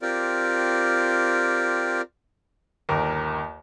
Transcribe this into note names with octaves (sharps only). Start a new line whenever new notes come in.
C4 F4 G4 A#4 D5
G1 D#2 A#4